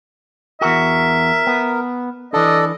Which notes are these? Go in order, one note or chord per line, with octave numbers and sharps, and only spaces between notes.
E2 F#4 A#4 E5
B3
E3 D4 A4 D5 D#5